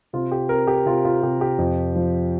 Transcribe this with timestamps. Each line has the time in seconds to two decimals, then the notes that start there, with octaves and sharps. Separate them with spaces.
0.13 C3 F4
0.32 G4
0.49 C4 A#4
0.67 G4
0.86 C3 F4
1.05 F4
1.23 C3 G4
1.41 G4
1.58 F2
1.96 F3